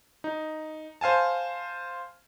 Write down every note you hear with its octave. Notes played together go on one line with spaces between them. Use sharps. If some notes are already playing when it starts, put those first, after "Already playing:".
D#4
C5 F5 G#5 A5